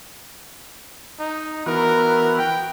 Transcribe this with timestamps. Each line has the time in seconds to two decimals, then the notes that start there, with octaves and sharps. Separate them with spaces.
1.19 D#4
1.66 E3 B3 F#4 A#4
2.39 G5